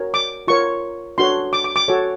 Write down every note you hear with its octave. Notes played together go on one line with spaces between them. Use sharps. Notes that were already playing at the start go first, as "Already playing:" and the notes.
Already playing: F#4 A#4 C#5
D6
F4 A#4 C#5 C#6
D4 F#4 A4 C#5 C6
D6
D6
D6
F#4 A4 C#5